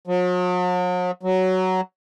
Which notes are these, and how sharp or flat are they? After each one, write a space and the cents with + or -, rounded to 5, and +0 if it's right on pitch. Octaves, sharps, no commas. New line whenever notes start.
F#3 -45
F#3 +10